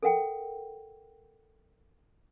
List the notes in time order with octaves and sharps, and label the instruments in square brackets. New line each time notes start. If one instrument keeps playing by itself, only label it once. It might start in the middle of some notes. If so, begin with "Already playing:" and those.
[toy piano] A4 A#4 F#5 G5